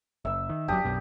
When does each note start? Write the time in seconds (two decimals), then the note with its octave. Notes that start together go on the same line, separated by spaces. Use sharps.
0.25 F#1 E5 E6
0.49 D#3
0.68 G1 F#2 F#3 D4 G4 D#6
0.85 B1 F#2 B2